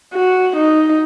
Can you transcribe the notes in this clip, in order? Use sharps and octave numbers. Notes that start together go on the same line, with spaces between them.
F#4
D#4